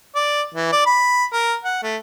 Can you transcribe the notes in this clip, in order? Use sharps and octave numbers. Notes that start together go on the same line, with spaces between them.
D5
E3
D5
B5
A#4
F#5
A3